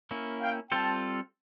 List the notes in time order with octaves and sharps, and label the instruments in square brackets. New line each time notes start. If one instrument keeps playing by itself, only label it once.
[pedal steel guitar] A#3 C#4 E4
[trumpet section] F5 G5
[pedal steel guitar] G3 C4 F4 A4 C5 [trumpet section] G5 A5